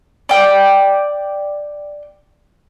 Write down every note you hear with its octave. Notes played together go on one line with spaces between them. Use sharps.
D5 G5